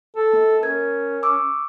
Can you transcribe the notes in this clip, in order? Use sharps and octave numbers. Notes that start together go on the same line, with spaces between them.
A4
A#3
C#4 A#4 G#6
C#6 D6 E6